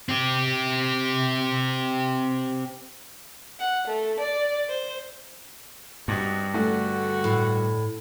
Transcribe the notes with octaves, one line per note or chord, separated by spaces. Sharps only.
C4 G4
F#5
A3
D5
C5
G2 C4 D#4 F#4
D3 A3 F#4
A2